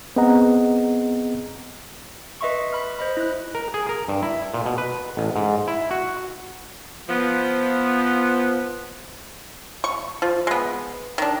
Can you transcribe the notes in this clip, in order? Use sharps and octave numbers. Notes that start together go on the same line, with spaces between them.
B3 C4 G#4 D#5 F#5 A#5
B4 D#5 E5 C6 C#6
B5 F6
C5 D#5 B5
E4 F#6
A#4
G#4
A#4
G2
E4
A#2
B2
B4
A1
G#2
E4
F#4
F3 B3
C#6
F3
G#3 B3
D#3 D4